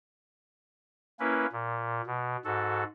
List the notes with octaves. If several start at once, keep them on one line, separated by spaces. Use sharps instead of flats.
A#3 C#4 E4 B4
A#2
B2
G#2 F#4 A4